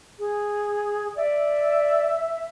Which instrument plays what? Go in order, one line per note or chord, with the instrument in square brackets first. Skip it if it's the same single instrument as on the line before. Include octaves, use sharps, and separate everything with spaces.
[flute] G#4
[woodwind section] D5 [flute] E5